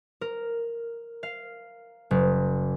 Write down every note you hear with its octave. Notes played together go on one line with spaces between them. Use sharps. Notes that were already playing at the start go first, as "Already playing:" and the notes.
A#4
F5
F#1